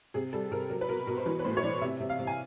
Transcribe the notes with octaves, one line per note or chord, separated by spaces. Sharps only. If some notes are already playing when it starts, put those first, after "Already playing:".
C3 G#4
G3 A4
C3 A#4
F#3 A#4
B4
B2 A#4
B2 A#4
C5
E3 B4
B4
A2 C5
C#5
E3 D5
C3 E5
C3
F5
C3
G#5